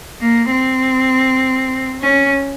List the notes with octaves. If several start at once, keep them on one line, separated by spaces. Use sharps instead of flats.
A#3
C4
C#4